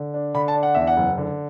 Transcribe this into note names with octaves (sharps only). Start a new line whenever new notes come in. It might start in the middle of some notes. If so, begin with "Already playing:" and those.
Already playing: D3
D4
D3 B5
A5
D4
F#5
E2 E5
F#5
F#1
D3